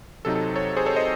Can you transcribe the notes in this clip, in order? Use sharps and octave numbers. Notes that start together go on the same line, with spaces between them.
C3 F#3 C4 D#4 A4
A4
A4 C#5
G#4 C5
A4 C#5
C5 D#5